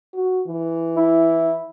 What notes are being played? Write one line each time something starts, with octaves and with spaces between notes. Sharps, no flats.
F#4
E3
E4